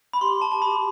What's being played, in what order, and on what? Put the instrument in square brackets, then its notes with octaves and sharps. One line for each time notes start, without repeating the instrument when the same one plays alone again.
[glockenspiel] B5
[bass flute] G4 [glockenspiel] C6
[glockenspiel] A5
A5
B5